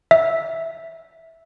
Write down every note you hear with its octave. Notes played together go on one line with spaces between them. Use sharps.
E5